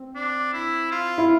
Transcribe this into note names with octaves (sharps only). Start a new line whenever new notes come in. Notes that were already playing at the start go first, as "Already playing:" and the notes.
Already playing: C4
D4
E4
F4
E4